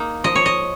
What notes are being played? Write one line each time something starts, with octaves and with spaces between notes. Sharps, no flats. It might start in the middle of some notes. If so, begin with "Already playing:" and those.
Already playing: A#3 D#4
F3 D#5
C#5
D#5